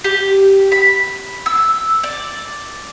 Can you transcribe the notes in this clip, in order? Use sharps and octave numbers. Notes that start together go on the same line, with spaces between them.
G4
B5
E6
D5